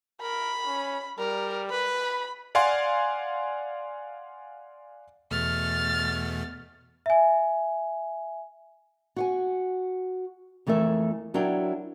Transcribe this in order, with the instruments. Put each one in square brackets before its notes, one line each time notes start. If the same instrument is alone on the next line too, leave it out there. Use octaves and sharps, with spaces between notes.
[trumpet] A#4 [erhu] B5
[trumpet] C#4
[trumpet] G3 [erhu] A#4
[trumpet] B4 [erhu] B5
[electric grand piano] D5 F5 F#5 G#5 C6
[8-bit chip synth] E2 B2 A3 [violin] F6 A6
[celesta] E5 G#5
[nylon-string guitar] F#4 F#5 G#5
F2 E3 A3 A#4 E5
F#3 D4 E4 A#4 C#5 G5